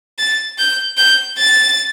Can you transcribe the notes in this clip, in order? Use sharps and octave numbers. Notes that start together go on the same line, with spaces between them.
A6
G6
G6
A6